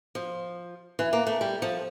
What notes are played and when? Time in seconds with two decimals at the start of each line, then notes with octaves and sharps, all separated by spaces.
0.15 F3
0.99 E3
1.13 A#3
1.27 A3
1.41 G3
1.62 F3